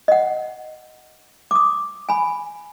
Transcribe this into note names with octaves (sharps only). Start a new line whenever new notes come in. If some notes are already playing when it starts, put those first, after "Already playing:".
D#5 F#5
D6 D#6
G#5 B5